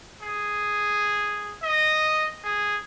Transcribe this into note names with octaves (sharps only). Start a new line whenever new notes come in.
G#4
D#5
G#4